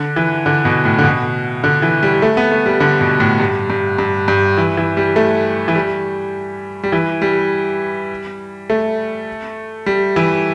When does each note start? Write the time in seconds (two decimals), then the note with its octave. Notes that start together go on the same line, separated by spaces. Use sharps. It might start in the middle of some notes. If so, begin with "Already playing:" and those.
Already playing: D3
0.16 E3
0.46 D3
0.65 B2
0.85 A2
0.98 D3
1.04 B2
1.64 D3
1.82 E3
2.03 G3
2.22 A3
2.37 B3
2.52 A3
2.66 G3
2.80 D3
3.01 B2
3.20 A2
3.40 G2
3.70 G2
3.98 G2
4.28 G2
4.57 E3
4.77 E3
4.97 G3
5.16 A3
5.68 E3
5.75 G3
6.83 G3
6.92 E3
7.22 G3
8.70 A3
9.86 G3
10.16 E3